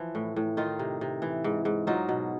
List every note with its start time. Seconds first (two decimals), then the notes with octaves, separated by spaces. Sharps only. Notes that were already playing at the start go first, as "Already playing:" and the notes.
Already playing: E3 F3 E4
0.15 A2
0.36 A2
0.57 D#3 D#4 F4
0.79 C3
1.01 C3
1.22 E3
1.44 G#2
1.65 G#2
1.87 F#3 D#4 F4
2.09 B2